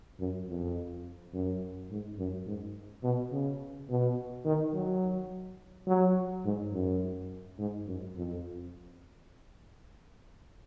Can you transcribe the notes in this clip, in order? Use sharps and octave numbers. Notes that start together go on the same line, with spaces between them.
F#2
F2
F#2
G#2
F#2
G#2
B2
C#3
B2
D#3
F#3
F#3
G#2
F#2
G#2
F#2
F2